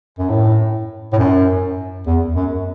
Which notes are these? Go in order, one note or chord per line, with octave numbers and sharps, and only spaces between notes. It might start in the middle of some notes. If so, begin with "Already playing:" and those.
F#2
A2
A2
F#2
E2
F#2